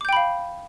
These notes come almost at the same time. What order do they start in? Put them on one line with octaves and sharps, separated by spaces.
D6 G6 G5 B5 F5